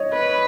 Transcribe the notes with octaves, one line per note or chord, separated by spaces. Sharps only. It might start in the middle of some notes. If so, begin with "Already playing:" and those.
Already playing: C#5 D#5
B4